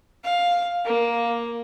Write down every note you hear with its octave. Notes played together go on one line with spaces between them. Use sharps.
F5
A#3